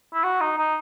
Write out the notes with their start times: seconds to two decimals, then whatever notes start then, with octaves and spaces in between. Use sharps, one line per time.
0.13 E4
0.24 F#4
0.41 D#4
0.58 D#4